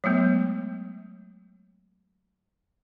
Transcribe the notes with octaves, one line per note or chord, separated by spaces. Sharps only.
F#3 G#3 A3 B3